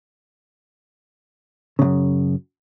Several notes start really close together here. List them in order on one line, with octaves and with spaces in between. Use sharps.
C#3 A#2 F#2